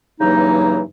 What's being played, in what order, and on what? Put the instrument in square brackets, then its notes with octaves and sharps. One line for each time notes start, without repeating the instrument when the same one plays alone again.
[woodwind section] G2 C#3 E3 F#3 A#3 D#4